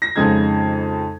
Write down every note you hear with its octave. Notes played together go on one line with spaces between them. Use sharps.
A#6
F2 C#3 G#3 D#4 G#6